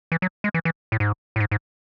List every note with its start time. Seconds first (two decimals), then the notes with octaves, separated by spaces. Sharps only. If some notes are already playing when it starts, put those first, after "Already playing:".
0.12 E3
0.22 F#3
0.44 G#3
0.54 E3
0.65 E3
0.92 A2
1.00 G#2
1.36 A2
1.40 G#2
1.51 G#2